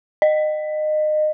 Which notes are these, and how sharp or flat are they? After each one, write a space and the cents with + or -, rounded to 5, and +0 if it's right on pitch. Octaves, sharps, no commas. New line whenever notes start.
D#5 -25